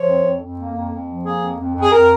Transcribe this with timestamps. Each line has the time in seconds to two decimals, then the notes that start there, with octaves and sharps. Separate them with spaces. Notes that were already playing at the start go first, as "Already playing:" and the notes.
Already playing: F3 C#5
0.08 F2
0.25 F2
0.41 F2
0.58 A#3
0.75 F2
0.92 F2
1.08 F3
1.25 A#3 G#4
1.42 F2
1.59 F2
1.75 F2
1.81 G#4
1.92 F2 A#4